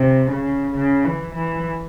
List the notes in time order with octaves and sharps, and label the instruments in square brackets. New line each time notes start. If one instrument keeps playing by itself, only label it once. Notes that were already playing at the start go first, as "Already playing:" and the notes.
Already playing: [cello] C3
C#3
C#3
E3
E3